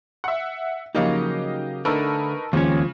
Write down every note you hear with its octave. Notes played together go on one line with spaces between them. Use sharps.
E5 F#5
C#3 F3 F#3 A#3 D#4 G4 D#5 F5
D3 A3 D#4 A#4 B4 A5 C#6 E6
D#2 C#3 F3 G#3 C#4